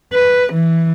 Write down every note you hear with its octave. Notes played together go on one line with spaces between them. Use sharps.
B4
E3